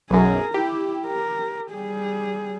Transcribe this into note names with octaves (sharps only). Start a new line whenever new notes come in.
B1 F#2 G#4 A#4
E4 G4
A#4
G3 G#4